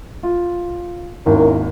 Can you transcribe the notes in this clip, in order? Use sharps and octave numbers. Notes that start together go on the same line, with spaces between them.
F4
G#1 D#2 C#4 E4 A#4